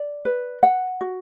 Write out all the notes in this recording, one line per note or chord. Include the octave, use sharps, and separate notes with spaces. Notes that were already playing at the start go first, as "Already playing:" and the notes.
Already playing: D5
B4
F#5
F#4